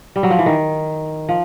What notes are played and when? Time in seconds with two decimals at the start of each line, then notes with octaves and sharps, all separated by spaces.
0.16 G3
0.23 F#3
0.30 F3
0.39 E3
0.46 D#3
1.29 F3